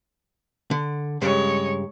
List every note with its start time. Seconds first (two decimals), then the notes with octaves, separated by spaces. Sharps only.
0.71 D3
1.22 G2 C#3 G#3 C#5